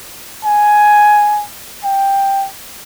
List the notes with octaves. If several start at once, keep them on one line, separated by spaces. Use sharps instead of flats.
G#5
G5